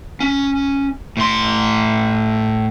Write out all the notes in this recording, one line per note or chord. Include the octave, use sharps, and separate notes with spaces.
C#4
A2 C6